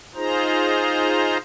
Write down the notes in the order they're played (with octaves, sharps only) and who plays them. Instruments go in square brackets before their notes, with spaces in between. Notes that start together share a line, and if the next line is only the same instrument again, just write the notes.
[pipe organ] D#4 F4 G#4 C5 A#5